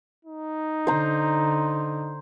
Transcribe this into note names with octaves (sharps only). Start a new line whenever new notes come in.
D#4
D3 C5 A#5